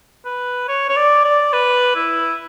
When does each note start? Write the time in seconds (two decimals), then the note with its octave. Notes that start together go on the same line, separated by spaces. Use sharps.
0.25 B4
0.68 C#5
0.89 C#5
0.96 D5
1.24 D5
1.53 B4
1.95 E4